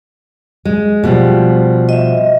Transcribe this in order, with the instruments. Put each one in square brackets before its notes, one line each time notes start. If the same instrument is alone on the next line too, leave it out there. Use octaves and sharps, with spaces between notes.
[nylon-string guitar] G#3
B2 F3 G3
[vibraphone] D#5 E5